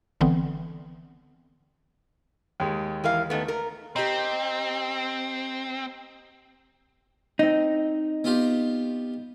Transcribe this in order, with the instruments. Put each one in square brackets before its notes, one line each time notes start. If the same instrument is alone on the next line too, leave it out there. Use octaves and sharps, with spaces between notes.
[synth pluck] G1 D3 E3 B3 C4
[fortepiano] D#2 G#3
[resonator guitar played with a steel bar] E3 A#4 F5
D#3 A3 B3
A#4
[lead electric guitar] C4 [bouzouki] D#4 G4
[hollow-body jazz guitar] C4 D#4
[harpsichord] B3 F4 G4